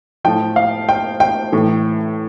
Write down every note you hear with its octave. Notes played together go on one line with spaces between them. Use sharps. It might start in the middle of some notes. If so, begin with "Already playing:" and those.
A2 F3 G5
F5
G5
G5
A2 E3